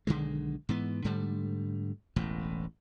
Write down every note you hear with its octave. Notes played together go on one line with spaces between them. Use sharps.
B1 D3 D#3 G#3
G#2 E3 B3
G#2 D3 G3 A3
E1 A1 A2